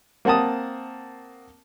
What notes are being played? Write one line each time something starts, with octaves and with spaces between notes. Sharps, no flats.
A#3 C4 F#5 A5 D#6